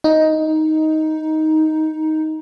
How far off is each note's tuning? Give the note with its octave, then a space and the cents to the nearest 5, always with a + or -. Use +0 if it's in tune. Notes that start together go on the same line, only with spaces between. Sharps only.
D#4 +10